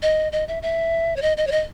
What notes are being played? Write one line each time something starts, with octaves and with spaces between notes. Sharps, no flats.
D#5
D#5
E5
E5
C#5
D#5
D#5
C#5
D#5